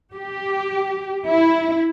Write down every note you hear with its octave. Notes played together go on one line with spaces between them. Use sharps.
G4
E4